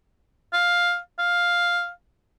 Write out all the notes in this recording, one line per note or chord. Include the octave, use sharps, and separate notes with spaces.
F5
F5